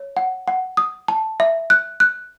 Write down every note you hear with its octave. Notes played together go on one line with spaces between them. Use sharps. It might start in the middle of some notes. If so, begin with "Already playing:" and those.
Already playing: C#5
F#5
F#5
D#6
A5
E5
F#6
F#6